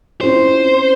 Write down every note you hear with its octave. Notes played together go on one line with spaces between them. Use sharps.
C4 C#4 E4 C5